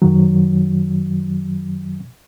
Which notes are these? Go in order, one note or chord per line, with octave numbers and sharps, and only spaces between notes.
F#2 D#3 F#3